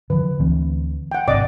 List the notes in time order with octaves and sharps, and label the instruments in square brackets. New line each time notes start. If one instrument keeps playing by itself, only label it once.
[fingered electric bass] D3 D#3 F3 [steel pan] B4
[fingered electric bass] D2 E3 C4
[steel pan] F#5 G5
[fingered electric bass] G#1 C3 [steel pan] D5 D#5 D6